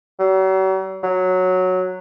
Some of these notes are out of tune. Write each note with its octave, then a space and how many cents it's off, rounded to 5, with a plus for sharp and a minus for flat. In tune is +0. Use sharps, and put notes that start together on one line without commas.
F#3 +45
F#3 -5